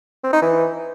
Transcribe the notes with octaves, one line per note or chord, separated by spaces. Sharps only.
C4
D#4
E3